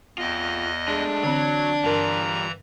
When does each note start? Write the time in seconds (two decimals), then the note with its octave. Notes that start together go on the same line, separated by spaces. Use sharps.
0.18 E2 F4 D#5 G5
0.88 G#3 A3 D4
1.23 D3 E3 F#3 C4 G#6
1.84 G2 E3 G3 F4 A#4 A#5